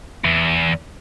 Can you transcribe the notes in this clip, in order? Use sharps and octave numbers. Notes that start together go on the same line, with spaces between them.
E2